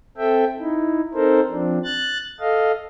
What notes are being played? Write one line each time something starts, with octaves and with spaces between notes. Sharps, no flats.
C4 A4 E5 G5
D#4 E4
C4 D#4 A4 A#4 C5
F3 C4 D4
F#6 A6
A4 D#5 F5